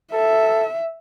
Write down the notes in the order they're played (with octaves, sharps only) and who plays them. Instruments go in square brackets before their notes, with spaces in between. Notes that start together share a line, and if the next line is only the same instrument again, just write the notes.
[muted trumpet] A4 [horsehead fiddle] E5